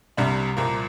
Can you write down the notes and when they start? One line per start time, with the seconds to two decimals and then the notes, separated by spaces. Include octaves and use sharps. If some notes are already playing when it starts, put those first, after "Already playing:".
0.17 C2 C3 G3 D4
0.57 C2 A#2 F3 A#3